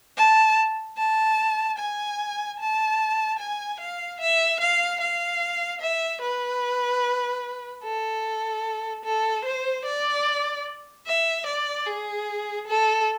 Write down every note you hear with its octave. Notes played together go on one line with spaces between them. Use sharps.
A5
A5
G#5
A5
G#5
F5
E5
F5
F5
E5
B4
A4
A4
C5
D5
E5
D5
G#4
A4